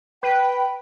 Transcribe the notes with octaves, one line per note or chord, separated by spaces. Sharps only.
B4 G5